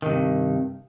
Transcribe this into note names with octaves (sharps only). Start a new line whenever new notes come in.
G2 C3 D#3